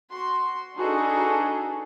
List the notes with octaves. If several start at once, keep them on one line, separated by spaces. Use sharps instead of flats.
F#4 C6
D4 D#4 F#4 G#4 A4 B4